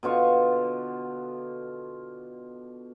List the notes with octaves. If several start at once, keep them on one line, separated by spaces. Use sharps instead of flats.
B2 D3 F4 C#6